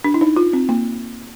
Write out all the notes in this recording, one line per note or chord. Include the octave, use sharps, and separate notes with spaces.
D4
E4
D#4
F4
C4
A#3